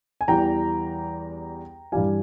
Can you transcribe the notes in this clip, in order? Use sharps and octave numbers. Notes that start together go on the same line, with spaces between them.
G#5
E2 E3 G3 G5 A#5
G2 E3 G3 F5 G#5